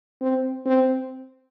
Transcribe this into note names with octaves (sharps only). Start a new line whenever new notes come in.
C4
C4